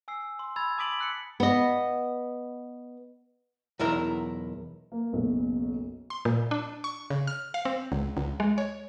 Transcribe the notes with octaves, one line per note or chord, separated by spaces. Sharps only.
G#5 E6 C7
C6
B5 E6 G#6 A6
A5 D6 D#6 B6 D7 F#7
E6 F#6 B6 C#7
B3 D#5
B1 E2 E4 A#4
A#3
F#1 B1 B2
C6
A#2
D4
C#6
C#3
F6
F5
C4
C#2
C#2
G#3
C#5